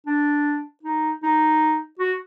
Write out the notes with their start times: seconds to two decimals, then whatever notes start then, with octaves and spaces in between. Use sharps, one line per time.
0.07 D4
0.83 D#4
1.23 D#4
1.99 F#4